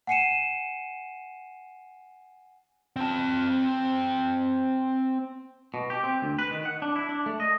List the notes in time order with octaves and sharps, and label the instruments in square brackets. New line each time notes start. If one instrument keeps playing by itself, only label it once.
[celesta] F#5 G#5 C7 C#7 D#7 E7
[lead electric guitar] C4 A5
[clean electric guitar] B2
G4
C4
D2
B4
D#3
F#5
D4
E4
D4
A3
D#5